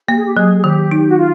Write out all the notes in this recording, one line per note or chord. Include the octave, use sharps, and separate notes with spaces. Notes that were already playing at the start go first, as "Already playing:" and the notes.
A#3 G4
G#4
G4
F#3 G#4
G#4
D#3 G4
D#4
F#4
F4